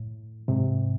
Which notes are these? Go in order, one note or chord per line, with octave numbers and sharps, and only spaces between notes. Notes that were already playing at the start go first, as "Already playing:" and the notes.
Already playing: A2
G#2 C3